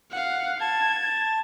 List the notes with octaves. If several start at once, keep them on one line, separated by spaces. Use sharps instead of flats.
F5 F#5
A5 G#6